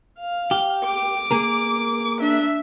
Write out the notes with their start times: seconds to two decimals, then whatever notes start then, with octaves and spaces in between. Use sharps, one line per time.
0.19 F5
0.51 G4
0.85 D6
1.31 A#3 G#4 A#4
2.20 D4 E5